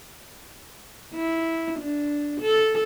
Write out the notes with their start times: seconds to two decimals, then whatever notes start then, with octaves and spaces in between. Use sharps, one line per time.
1.15 E4
1.79 D4
2.40 A4